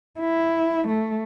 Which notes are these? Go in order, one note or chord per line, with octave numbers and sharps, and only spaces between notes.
E4
A3